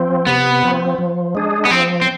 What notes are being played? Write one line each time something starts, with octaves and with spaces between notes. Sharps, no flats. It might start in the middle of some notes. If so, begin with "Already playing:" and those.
Already playing: F3 C4
C3 B3
F3 C4
F3
G#3 D4 G#4
B3
F3 C4
C4